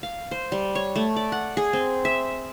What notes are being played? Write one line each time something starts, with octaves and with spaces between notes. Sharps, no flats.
F5
C5
G3
C#5
A3
D5
F#5
G#4
C4
E5